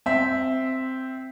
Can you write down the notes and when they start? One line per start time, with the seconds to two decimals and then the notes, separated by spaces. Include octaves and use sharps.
0.06 C4 E5